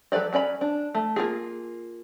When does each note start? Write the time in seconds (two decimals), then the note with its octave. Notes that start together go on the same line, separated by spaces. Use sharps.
0.12 F#3 A4 B4 D5 D#5
0.33 F#3 C#4 D5 B5
0.61 D4
0.95 A3
1.16 A#3 F4 G#4